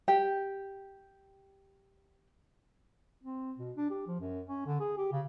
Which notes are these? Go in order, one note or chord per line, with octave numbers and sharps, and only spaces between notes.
G4 G5
C4
B2
D4
G4
F3
F#2
C#4
D3
G#4
G4
C#3